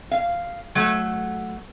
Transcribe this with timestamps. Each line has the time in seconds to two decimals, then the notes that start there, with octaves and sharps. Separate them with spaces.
0.11 F5
0.75 F#3 A3